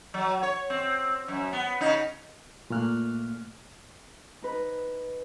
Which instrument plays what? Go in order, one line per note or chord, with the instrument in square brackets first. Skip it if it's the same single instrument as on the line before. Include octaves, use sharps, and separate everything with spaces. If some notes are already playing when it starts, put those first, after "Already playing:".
[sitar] F#3
C#5
C4
F#2
B3
C#3 D#4
[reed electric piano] A#2 A3 A#3 F6 F#6
[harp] D#4 B4